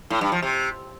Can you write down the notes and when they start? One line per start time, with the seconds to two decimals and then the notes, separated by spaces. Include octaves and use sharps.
0.10 A2
0.21 G2
0.32 F3
0.43 C3